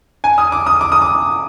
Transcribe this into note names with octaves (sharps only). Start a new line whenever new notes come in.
G#5
D#6
D6
D#6
D6
D#6
D6